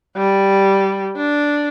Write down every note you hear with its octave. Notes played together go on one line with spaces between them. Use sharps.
G3
D4